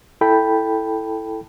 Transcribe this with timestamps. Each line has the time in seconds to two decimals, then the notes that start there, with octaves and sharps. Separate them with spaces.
0.21 E4 A4 G5 A5 B5